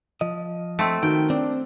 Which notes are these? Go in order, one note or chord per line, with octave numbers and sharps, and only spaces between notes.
F3 D#5
A3 C4
D#3 F#4 G5
C4 D4